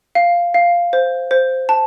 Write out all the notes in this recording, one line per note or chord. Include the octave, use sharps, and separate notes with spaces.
F5
F5
C5
C5
A5